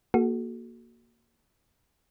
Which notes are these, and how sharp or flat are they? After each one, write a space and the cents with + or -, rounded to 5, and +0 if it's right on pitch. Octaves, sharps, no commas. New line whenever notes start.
A#3 +0 F#4 +0 A4 -40